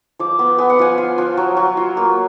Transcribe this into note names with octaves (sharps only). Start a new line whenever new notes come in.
F3 D6
B3
B3 G#5
F#5
F3 G#5
F4
F3
F#3
F#3
F4
A#3